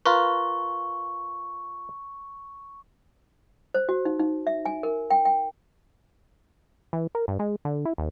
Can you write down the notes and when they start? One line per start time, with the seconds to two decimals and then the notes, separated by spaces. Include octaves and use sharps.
0.06 F4 A#4 B4 C#6
3.74 C5
3.89 F#4
4.05 D#4
4.19 D#4
4.47 E5
4.65 G#5
4.83 A#4
5.11 G5
5.25 G5
6.93 E3
7.15 A#4
7.28 G2
7.39 G#3
7.65 D3
7.85 E4
7.98 D#2